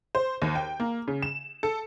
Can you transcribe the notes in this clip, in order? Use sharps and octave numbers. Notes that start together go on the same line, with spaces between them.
C5
D#2
G5
A#3
C#3
E7
A4